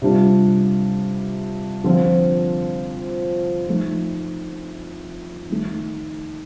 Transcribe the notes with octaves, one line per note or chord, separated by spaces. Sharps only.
C3 G3 D4 F4
D3 F3 C4 F4
F3 A3 D#4
D#3 A3 D#4